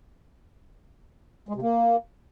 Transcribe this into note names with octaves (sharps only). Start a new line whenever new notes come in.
G#3
C3
A#3